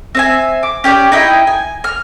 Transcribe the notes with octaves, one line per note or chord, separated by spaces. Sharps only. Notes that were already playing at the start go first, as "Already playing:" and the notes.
C4 E5 G#5
D6
C#4 G4 A#4 D5
D#4 E4 D#5 G5
G#5
F6